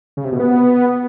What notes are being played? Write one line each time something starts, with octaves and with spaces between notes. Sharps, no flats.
C#3
C3
B2
B3